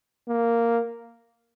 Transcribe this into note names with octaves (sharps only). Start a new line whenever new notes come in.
A#3